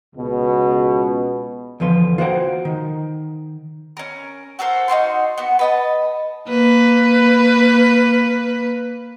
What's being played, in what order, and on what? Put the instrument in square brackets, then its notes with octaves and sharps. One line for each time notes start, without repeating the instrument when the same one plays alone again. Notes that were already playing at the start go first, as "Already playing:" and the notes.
[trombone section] C#2 B2
[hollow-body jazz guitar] E2 D3 F3 B4 C6
F4 F#4 C5 F#5 G5
D#3
[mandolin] C#4 A#4
F#4 A4 A#4 C5
D#4 E4 F#4 C6
B3 F#4
B4 D#5 A5
[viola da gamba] A#3 B4